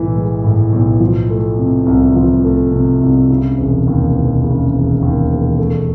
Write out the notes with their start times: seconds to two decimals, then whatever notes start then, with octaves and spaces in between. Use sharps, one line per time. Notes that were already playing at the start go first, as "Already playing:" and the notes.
Already playing: B1 A2 E3
0.16 G#3
0.44 A2
0.72 B1
1.00 F3
1.30 A3
1.59 C3
1.86 C2
2.16 F3
2.44 A3
2.72 C3
3.02 C2
3.30 C#3
3.58 E1
3.87 D#2
4.15 E1
4.44 C#3
4.73 E1
5.02 D#2
5.30 E1
5.58 A3